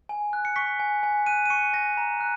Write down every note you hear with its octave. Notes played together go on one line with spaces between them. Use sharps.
G#5
F#6
C#7
C#6 B6
G#5
G#5
F#6 D#7
D#7
C#6 C#7
G#5 A#6
A#5
F#6